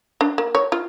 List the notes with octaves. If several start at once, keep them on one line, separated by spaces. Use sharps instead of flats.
D4
A#3
C#5
F4